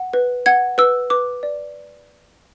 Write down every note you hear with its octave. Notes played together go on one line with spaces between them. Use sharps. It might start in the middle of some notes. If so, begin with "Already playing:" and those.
Already playing: F#5
B4
F#5 G#6
B4 E6
B4 D6
D5